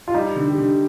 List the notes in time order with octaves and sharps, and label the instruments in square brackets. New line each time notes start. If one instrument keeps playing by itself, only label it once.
[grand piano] F4
[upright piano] G3 [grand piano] D#4
[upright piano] D3
[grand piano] G4
[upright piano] D3